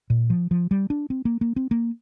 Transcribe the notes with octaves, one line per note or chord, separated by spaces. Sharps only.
A#2
F3
F3
G3
D4
C4
A#3
A#3
C4
A#3